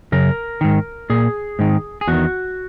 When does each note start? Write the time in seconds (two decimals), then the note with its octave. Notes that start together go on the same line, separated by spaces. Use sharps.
0.12 F#2 C#3 A#4
0.61 G#2 D#3
1.10 A#2 G#4
1.59 G#2 D#3
2.01 G#4
2.08 E2 D#3 F#4